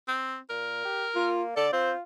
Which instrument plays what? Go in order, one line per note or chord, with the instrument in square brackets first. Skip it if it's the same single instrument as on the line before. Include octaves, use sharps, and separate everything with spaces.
[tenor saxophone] C4
[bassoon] A#2 [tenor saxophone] A#4
[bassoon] G4
[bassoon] A#3 [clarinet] F4
[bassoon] D3 [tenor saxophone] A4 [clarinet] D5
[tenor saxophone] C4 [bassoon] F4 [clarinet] C5